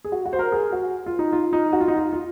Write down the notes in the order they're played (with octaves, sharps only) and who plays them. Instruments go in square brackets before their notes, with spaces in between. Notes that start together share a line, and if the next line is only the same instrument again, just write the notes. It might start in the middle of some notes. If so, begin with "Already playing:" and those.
[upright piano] G#4
F#4
F#4
C5
A#4
G#4
F#4
F4
D#4
F4
D#4
F#4
F4
D#4
F4
F4